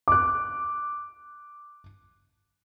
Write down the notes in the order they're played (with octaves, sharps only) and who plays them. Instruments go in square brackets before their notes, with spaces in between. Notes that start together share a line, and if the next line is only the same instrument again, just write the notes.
[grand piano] D6 F#6